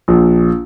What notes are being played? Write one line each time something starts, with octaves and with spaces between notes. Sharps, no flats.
A#1